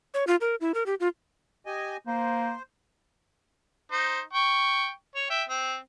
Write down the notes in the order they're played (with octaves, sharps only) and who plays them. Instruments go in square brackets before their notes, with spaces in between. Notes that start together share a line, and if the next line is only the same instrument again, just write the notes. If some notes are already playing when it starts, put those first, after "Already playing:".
[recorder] C#5
F4
A#4
E4
A#4
G4
F4
[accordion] G4 D#5 G#5
[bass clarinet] A#3 [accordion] C5
[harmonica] D#4 C5
G5 C#6
C#5
E5 G5
C4